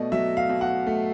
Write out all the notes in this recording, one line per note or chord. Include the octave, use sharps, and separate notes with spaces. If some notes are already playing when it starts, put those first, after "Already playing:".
Already playing: B2 A3 D5 D#5
F#3 E5
F5
B2
F#5
A3